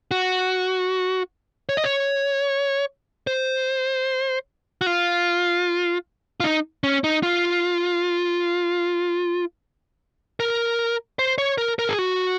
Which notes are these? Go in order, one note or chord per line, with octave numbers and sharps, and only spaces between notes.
F#4
C#5
D#5
C#5
C5
F#4
F4
F4
D#4
C#4
D#4
F4
A#4
C5
C#5
A#4
A#4
G#4
F#4